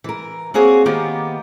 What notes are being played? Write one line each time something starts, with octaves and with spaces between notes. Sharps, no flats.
E3 A#4
A#3 C4 F#4 G#4 C#5
D#3 A#3 B3 G4